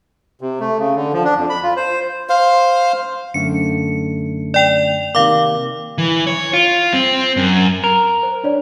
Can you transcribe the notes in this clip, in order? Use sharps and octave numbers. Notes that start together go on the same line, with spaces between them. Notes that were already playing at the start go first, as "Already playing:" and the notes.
C3
A3
C#3
D3
F3
D4
F2
B5
F4
C5
C5 F5
F#2 D3 A3 C#7
D5 G5 F7
C3 D#3 A#3 F5 D6
E3
C#5
F4
C4
F#2
A#4
C5
D4 C#5 D5